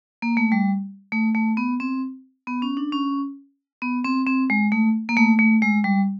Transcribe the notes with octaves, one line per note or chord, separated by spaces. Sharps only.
A#3
A3
G3
A3
A3
B3
C4
B3
C#4
D4
C#4
B3
C4
C4
G#3
A3
A#3
A3
A3
G#3
G3